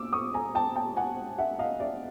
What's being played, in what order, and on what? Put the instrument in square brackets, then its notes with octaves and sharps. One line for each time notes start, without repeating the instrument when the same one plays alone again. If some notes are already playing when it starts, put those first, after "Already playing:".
Already playing: [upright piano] A#2 D6 E6
C#6 D#6
G#5 A#5
G5 A5
G5 A5
F#5 G#5
E5 F#5
D#5 F5
D5 E5